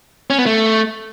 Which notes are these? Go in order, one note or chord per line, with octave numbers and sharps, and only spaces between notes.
C#4
B3
A3